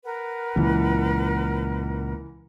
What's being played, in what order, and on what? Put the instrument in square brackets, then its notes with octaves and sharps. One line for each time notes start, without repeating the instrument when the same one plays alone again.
[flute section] A#4 B4 F#5
[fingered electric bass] C#2 A#2 [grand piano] E3